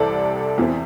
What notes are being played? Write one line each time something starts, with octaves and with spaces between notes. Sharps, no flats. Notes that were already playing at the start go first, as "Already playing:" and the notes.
Already playing: C2 C3 E3 C4 A4 D5
E2 E3 C4